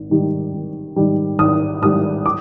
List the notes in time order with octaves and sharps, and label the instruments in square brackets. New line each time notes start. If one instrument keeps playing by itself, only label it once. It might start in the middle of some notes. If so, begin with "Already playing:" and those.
Already playing: [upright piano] G#1
G#2 D#3 G3
G#1
G#2 D#3 G3
G#1 D#6
G#2 D#3 G3 D#6
D6